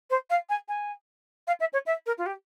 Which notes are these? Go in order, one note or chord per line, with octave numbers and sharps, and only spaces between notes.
C5
F5
G#5
G#5
F5
E5
C#5
E5
A#4
F4
G4